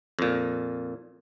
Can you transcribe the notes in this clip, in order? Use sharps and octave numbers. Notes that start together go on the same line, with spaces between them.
F2 A#2